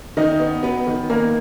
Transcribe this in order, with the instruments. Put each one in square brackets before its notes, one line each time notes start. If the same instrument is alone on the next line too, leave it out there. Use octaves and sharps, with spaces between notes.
[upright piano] D#3 D#4 D#5
B3
F#3 B3 B4
D#3
D#3 A#3 A#4